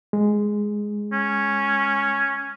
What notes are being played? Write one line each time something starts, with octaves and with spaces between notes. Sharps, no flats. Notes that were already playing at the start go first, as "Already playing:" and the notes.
G#3
C#4